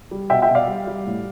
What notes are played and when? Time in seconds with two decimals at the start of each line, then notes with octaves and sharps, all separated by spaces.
0.11 G3
0.30 B2 E5 G5
0.42 E5 G5
0.49 B2
0.55 D5 F5
0.67 G3
0.87 G3
1.07 A2